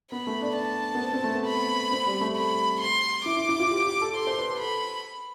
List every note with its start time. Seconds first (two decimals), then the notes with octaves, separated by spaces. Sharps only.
0.11 B3 B5
0.27 A3
0.42 D4
0.56 A5
0.95 B3
1.02 C4
1.13 C4
1.24 A3
1.35 B3
1.46 B5
1.92 C4
2.06 G3
2.21 A3
2.36 B5
2.81 C6
3.25 E4 D6
3.37 E4
3.49 E4
3.60 F4
3.70 G4
3.85 G4
4.01 A4
4.16 C6
4.27 C5
4.38 B4
4.49 A4
4.60 B5